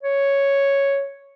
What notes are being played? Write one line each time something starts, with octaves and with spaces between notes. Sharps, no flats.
C#5